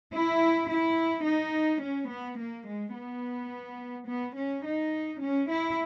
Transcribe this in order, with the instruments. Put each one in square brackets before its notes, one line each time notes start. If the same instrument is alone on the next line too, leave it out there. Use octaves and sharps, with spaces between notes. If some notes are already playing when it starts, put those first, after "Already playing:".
[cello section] E4
E4
D#4
C#4
B3
A#3
G#3
B3
B3
C#4
D#4
C#4
E4